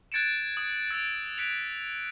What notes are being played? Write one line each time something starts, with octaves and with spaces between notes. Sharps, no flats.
F#6 G#6 A6 C#7 D7 E7
D#6
E6 A6 D7 F7
F#6 B6 C#7 D7 F7